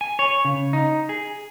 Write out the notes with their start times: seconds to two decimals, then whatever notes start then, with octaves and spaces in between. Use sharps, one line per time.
0.01 G#5
0.19 C#5
0.45 C#3
0.73 D#4
1.09 G#4